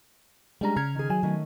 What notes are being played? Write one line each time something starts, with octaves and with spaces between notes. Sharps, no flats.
G3 G#3 C#4 D4 A#5
C#3 A#5 F6 G#6
D#3 G#4
F#3 G#5
D#3 A3 C#4